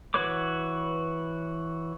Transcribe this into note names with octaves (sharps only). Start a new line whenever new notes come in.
E3 F#4 B4 C#5 D6